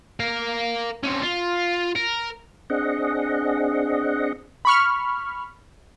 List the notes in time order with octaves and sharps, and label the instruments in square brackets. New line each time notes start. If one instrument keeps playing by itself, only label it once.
[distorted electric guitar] A#4 F5
C4 C#4
F4
A#4
[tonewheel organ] C4 D4 G#4 D#5 F#5
[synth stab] B5 C#6 F6